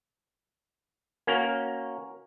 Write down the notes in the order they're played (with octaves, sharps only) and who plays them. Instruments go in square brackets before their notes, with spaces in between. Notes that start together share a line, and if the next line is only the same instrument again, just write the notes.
[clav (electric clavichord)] A#3 C#4 F#4 A#4